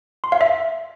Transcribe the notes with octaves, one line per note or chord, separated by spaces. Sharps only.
C6
F5
E5